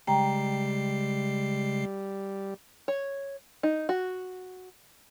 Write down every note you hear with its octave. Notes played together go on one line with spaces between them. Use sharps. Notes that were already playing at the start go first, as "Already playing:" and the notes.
C#3 G3 G#3 G5 A#5 C7
C#5
D#4
F#4